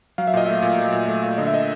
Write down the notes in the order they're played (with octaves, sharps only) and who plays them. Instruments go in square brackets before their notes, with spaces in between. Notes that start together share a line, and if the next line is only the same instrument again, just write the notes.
[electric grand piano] F#3 F5
E5
A#2 D#5
A3 E5
A#2
F#3
A#2
A3
A#2
D3 D#5
E5
D#5